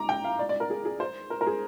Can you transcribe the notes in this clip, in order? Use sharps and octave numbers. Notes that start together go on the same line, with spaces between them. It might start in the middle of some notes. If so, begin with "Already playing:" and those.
Already playing: A#5 D6
G5
F5
D5
D5
A#4
G#4
G#4
C5
A#4
A#4
G#4